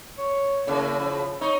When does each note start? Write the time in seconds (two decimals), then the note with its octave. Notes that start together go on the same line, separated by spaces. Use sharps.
0.18 C#5
0.67 A2 C#3 A#3
0.99 F3
1.41 D#4 C#5